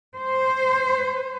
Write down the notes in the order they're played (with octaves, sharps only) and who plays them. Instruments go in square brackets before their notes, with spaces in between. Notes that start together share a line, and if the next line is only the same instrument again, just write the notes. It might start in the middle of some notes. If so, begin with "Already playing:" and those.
[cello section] C5